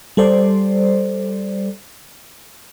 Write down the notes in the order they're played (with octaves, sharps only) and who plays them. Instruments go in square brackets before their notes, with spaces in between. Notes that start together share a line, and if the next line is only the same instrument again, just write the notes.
[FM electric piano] G3 A4 C5 D5